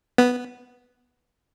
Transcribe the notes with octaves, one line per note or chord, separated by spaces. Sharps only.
B3